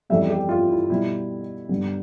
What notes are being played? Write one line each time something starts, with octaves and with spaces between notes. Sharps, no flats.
F2 E3 G3 B3 E5
G4
F4
E4
B2 G3 B3 E4
G2 D3 G3 B3